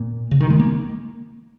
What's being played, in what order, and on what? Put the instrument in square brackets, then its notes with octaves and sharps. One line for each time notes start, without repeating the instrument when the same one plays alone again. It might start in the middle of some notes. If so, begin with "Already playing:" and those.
Already playing: [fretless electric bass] A#2
C#3
D#3
G#3
A#3